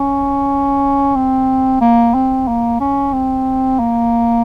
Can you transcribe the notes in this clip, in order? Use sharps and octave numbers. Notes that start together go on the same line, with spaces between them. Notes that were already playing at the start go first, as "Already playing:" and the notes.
Already playing: C#4
C4
A#3
C4
A#3
C#4
C4
A#3